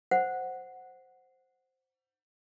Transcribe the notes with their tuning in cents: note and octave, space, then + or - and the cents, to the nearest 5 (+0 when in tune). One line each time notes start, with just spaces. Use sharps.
C5 +0 F#5 +0